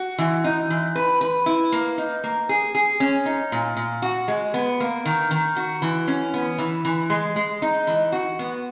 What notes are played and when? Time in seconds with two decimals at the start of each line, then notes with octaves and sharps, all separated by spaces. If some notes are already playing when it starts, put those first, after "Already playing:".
Already playing: F#4
0.18 E3
0.44 D#4
0.70 E3
0.95 B4
1.21 B4
1.46 E4
1.72 A#3
1.98 D#4
2.24 A#3
2.49 G#4
2.75 G#4
3.00 C#4
3.26 D#4
3.52 A#2
3.77 A#2
4.02 F#4
4.28 G#3
4.54 B3
4.80 A#3
5.05 D#3
5.31 D#3
5.56 F#4
5.82 E3
6.08 C#4
6.34 B3
6.59 E3
6.85 E3
7.10 G#3
7.36 G#3
7.62 D#4
7.87 E3
8.12 F#4
8.39 B3